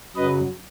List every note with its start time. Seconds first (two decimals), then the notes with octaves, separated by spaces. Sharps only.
0.16 F#2 C#3 F#3 B4 D#5